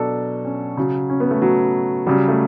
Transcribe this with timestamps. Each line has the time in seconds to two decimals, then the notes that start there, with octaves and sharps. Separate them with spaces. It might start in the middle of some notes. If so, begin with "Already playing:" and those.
Already playing: B2 F#3 D4 A4
0.45 C#4
0.77 C#3 F#3
1.10 C#4
1.20 B3
1.31 A3
1.42 F#3
2.06 C#3 F#3 G3
2.28 A3